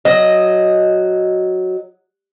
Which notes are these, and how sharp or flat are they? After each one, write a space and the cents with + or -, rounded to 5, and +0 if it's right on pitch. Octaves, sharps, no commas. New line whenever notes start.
F#3 +0 D#5 +0